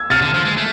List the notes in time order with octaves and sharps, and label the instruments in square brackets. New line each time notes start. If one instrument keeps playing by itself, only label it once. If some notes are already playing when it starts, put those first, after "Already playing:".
Already playing: [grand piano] E6 G#6
[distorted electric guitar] C3 [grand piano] F6 A6
[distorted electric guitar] D3
F3
G#3
A3